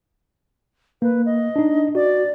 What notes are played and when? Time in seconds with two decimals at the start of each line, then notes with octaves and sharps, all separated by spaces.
1.02 A#3 B4
1.26 D#5
1.56 D4 D#4
1.95 F#4 D5